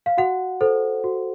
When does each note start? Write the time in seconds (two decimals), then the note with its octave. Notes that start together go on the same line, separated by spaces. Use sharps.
0.06 F5
0.18 F#4 F#5
0.61 A4 C5
1.04 F#4